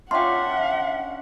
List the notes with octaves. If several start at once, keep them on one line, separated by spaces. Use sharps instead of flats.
C#4 D4 F4 E5 F#5 G5 C6